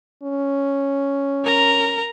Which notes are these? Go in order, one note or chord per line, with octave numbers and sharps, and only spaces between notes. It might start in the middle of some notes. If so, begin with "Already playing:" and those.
C#4
A#4 A#5